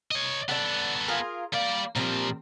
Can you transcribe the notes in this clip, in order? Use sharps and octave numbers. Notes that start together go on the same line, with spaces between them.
C#5 D#5
B3 A4 D5 F#5
F4 G#4 A#4
G3 A#3 D5
A#2 F3 G3 C4 A#4